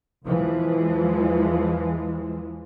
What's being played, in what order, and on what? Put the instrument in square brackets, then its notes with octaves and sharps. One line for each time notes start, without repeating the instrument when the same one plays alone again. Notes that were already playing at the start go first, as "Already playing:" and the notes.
[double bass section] E2 E3 F3 G#3